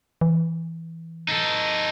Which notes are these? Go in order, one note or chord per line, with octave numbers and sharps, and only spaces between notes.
E3
D#4 A4